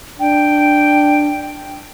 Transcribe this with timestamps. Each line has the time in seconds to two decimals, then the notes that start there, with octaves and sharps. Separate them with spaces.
0.20 D4 G5